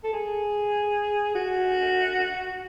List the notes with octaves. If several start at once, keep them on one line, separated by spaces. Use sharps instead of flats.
A4
G#4
F#4